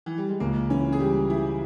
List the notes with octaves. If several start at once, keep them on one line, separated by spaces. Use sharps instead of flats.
E3
G3
G#3
C#2 A#3
E3 C#4
G#4
G3 G4
E3 E4